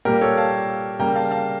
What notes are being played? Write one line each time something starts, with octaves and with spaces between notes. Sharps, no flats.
A#2 G3 A#3 G4 A#4
A4 C#5
F5 A5
C#3 G3 A#3 G5 A#5
F5 A5
F5 A5